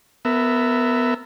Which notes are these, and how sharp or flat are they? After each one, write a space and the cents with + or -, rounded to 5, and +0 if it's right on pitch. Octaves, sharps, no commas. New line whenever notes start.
B3 +10 A#4 -20 E5 +0